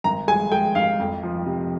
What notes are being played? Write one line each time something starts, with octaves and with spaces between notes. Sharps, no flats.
G#1 A#5
G#3 G#5
G#3 G5
G#1 F5
F2
F3
C3